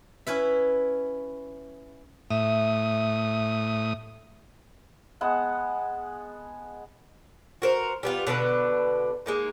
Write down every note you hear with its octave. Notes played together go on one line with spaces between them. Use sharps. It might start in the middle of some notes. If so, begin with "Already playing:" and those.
C#4 E4 B4 E5
A2 E5 D#6
G#3 B3 F#5 A5
F#4 A#4 C5
G3 B3 F4
B2 D3 D4 B4
G#3 A#3 D#4